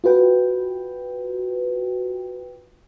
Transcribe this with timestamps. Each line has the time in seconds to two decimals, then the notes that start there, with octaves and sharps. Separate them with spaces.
0.04 F4 F#4 B4 G5